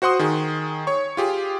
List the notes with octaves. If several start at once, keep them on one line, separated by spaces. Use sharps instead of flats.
F#4 C5 F#5 C6 D#6
D#3 G#4
C#5 C#6
F4 G4 G#4